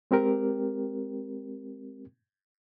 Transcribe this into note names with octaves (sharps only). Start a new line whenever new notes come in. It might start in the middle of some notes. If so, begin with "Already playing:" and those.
G#3 C4 G4 A#4